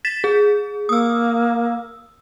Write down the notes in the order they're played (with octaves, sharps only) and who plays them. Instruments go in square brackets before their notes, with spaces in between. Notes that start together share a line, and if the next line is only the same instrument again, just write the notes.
[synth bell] A6 B6 E7
G#4
[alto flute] A#3 [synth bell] D#6 E6